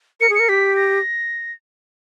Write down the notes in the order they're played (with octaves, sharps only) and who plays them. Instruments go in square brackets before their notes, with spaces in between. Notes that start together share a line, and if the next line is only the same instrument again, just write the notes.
[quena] A#4 [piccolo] C#7
[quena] G#4
[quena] A#4 [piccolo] C#7
[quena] G4 [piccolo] B6
[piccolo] A#6